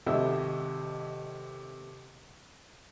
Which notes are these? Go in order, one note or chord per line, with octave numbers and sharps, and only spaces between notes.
G#1 C3 A4 D#5 E5 E6